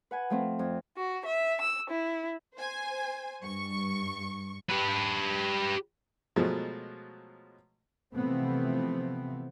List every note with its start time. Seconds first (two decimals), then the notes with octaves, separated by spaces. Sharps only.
0.11 B4 F#5 G#5
0.30 F3 A3 C4
0.59 F2
0.97 F#4
1.25 E5
1.62 E6
1.91 E4
2.56 C5 G#5
3.44 G2 C#6
4.70 G4 B4
6.36 B2 F3 F#3 G#3 A3
8.14 C3 E3 F3 A3 B3 C4